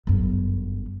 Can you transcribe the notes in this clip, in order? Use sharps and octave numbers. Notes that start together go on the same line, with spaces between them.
G1 F#2